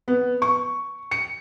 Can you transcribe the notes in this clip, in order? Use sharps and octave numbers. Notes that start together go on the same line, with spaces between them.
B3
C#6
C#7